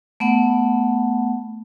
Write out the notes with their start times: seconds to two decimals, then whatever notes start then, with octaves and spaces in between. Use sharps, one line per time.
0.20 A3 B3 F#5